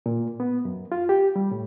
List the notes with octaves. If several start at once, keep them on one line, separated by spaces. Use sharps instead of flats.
A#2
B3
F#2
F4
G4
G3
A2